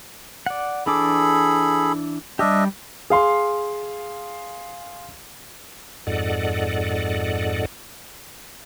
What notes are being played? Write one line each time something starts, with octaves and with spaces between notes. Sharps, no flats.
D5 F#5
E3 D4 G#4 A4 B5 D6
G3 D4 G4 D#5 E5
G#4 F5 C6
F2 G#2 A4 D5 D#5 F#5